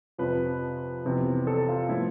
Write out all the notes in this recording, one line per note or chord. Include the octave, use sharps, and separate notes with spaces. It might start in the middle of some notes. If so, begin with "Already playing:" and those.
F2 C3 F3 B4
F2 C3 E3 B3
A4
F4
A2 F3 B3 E4